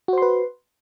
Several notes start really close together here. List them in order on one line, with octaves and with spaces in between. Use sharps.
F#4 C5 C6 B4